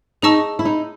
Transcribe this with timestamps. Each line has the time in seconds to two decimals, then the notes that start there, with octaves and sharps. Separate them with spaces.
0.22 D#4 G#4 D#5 A5 C#6 E6
0.59 E4
0.65 D#4